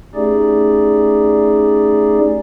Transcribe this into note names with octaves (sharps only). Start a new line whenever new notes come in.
A3 C#4 D#4 G4 G#4 D5